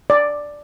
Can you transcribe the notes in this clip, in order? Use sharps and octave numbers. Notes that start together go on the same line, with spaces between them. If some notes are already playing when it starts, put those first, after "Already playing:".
D5